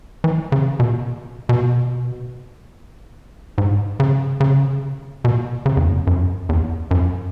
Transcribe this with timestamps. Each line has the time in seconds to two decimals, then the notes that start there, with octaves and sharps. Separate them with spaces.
0.24 E3
0.52 C#3
0.80 B2
1.49 B2
3.58 G#2
4.00 C#3
4.40 C#3
5.25 B2
5.66 C#3
5.77 E2
5.86 F#2
6.07 F#2
6.49 E2
6.91 F#2